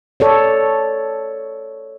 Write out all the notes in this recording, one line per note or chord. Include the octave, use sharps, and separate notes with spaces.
A4 C#5 D5